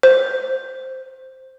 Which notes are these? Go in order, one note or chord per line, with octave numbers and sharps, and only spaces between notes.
C5